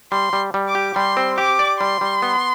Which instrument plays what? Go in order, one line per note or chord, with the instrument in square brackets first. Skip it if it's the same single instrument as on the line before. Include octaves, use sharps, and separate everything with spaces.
[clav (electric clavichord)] G3 [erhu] C6
[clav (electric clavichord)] G3
G3
[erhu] D6
[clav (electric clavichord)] G4
[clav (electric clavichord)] G3 [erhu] C6
[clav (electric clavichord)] C4
[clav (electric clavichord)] G4 [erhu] D6
[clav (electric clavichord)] D5
[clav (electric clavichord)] G3 [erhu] C6
[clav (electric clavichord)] G3
B3